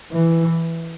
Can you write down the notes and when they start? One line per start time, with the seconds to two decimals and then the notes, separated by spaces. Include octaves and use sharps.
0.13 E3